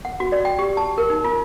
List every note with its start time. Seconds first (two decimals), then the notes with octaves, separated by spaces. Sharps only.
0.05 F#5
0.20 F#4
0.32 D5
0.45 G5
0.59 G4
0.77 A5
0.98 A#4
1.10 D#4
1.24 F4